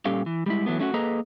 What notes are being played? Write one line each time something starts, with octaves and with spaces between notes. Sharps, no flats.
A#2 G3 C#4 G4 A4 F5
E3
G3 G#3 E4
E3 F#3 A3 B3
A3 C#4 D#4 F#4
A#3 G#4 A4 B4 D#5 A#5